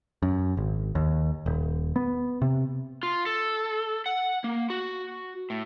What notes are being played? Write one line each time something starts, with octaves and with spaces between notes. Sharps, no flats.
F#2
G#1
D#2
D#1
B3
C3
F4
A4
F#5
A#3
F#4
A2